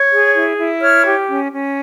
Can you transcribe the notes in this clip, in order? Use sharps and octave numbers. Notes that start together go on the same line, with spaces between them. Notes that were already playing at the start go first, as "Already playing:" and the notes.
Already playing: C#5
G#4
E4
E4
C#5 F6
G4
C#4
C#4